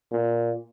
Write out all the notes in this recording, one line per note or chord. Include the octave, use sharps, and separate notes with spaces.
A#2